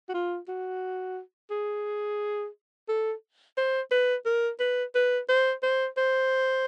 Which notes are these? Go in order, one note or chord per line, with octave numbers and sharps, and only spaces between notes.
F#4
F4
F#4
G#4
A4
C5
B4
A#4
B4
B4
C5
C5
C5